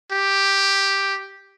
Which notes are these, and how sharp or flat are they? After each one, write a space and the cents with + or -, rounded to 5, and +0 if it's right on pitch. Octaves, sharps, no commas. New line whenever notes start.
G4 +0